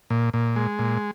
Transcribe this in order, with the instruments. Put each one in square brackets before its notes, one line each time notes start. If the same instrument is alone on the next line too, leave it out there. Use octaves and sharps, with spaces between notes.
[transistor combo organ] A#2
A#2
G#3
A#2